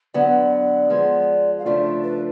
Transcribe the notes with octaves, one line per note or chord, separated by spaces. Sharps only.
D3 F#3 B3 D5
F3 G#3 B3
F5
C#3 F3 A3 D4 F4 D5
B4